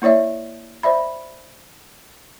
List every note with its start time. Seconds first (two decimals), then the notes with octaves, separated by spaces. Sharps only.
0.02 A#3 E4 C#5 D5 E5
0.83 C5 D5 E5 B5